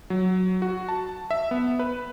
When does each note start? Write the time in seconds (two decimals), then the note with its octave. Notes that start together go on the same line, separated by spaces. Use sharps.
0.10 F#3
0.62 F#4
0.89 A5
1.31 E5
1.51 B3
1.79 B4